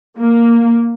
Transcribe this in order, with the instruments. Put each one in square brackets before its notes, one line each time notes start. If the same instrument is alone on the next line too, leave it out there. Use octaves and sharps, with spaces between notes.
[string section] A#3